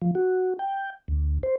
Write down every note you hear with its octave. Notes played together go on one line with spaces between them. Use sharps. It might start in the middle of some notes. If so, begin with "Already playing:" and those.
F3
F#4
G5
D2
C5